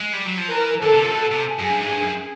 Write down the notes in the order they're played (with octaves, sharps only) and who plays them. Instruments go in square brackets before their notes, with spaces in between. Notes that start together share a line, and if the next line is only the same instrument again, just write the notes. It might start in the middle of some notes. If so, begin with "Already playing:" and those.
[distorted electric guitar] G#3
G3
F#3
F3
[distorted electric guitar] E3 [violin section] A#4
[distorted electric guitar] D3 [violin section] A4
[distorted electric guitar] C3
F3
C3
B2
C3
[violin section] G#4
[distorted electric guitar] F#2
G2
G#2
G2
F#2